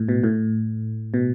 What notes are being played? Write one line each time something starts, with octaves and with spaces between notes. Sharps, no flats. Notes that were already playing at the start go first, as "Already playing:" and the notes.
Already playing: A2
B2
A2
B2